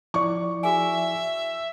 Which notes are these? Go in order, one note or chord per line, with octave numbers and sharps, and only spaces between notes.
F3 E4 D5 C#6
F#4 G#4 E5 G#5